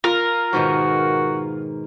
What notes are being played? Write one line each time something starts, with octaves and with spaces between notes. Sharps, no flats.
F4 A#4
G#2 B2 D#3 F#4